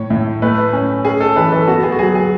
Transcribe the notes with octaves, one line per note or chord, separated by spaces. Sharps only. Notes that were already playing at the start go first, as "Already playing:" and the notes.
Already playing: A2 C#5
A2
A3 B4
C#4
C#4 G#4
A4
E3 B4
A4
B3 F#4
G#4
F#4
F#3 G#4
G#4